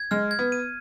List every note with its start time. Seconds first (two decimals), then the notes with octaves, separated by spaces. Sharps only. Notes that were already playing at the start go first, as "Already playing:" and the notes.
Already playing: G#6
0.11 G#3 F6
0.31 G#6
0.39 B3
0.52 D#7